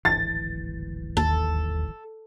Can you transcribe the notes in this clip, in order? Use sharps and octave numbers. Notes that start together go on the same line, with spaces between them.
D1 G#1 E3 A6
D#2 A4